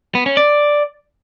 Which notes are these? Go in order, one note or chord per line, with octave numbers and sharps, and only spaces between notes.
B3
C#4
D5